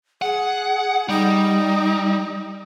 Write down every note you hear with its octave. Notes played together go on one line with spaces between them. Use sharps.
G#4 F#5
G3 D#4